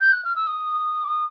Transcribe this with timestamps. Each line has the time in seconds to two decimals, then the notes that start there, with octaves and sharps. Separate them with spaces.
0.01 G6
0.12 F#6
0.25 F6
0.36 E6
0.47 D#6
1.04 D6
1.08 D#6